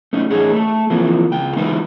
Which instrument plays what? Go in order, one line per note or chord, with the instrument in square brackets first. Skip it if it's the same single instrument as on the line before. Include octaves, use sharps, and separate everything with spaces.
[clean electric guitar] A3 C#4 D#4
E2 A2 D#4 G#4 C#5
A3 A4
E3 F3 A#3 C4
C#2 G5
E3 G#3 D#4 E4 B4